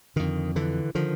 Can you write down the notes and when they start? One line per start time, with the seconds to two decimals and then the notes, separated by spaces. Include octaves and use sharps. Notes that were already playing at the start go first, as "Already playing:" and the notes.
0.16 F2 D3 D#3
0.56 D3 E3
0.95 D3 D#3 F3